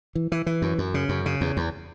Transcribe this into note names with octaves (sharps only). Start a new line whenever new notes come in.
E3
E3
E3
F#2
F#2
C#3
F#2
C#3
E2
E2